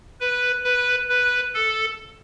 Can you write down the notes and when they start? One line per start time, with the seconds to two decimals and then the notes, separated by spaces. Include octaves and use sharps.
0.21 B4
0.64 B4
1.09 B4
1.54 A4